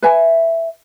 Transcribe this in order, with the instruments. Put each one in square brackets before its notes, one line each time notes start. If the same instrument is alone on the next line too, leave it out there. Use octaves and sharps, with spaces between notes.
[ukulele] B4 E5 G#5